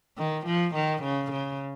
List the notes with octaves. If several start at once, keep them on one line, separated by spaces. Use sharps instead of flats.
D#3
F3
D#3
C#3
C#3